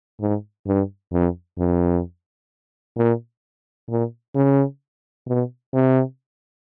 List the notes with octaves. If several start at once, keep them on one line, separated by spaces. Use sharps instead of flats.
G#2
G2
F2
F2
A#2
A#2
C#3
B2
C3